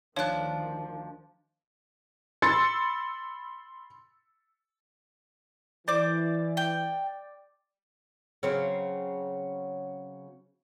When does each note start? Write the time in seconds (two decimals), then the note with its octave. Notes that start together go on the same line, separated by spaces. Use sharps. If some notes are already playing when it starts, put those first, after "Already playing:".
0.16 D2 D#3 F3 D4 C#5 D5 F#6
2.42 B5 C6 E6 A6 C#7
5.88 E3 C5 D5 D6
6.57 G5
8.43 C#3 F#3 C4